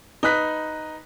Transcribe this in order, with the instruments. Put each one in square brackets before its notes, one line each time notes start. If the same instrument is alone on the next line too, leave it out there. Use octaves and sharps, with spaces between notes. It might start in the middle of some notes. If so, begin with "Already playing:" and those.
[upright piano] D#4 B4 F#6 B6